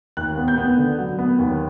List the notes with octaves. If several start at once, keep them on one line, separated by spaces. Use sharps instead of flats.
D#2 F#6
B3
G6
B3
D3
F#3
B3
D#2